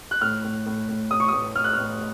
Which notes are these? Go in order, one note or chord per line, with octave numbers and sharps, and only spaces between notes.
F#6
A2 F6
A2
A2
A2
A2 D#6
C#6
D#6
A2
A2 F6
F#6
F6
A2